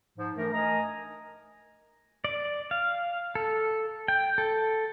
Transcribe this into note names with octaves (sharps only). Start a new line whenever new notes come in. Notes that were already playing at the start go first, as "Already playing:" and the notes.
G#2 F3
E3 A3 D4 A#4
A3 A#4 D#5 G#5 A#5
D5
F5
A4
G5
A4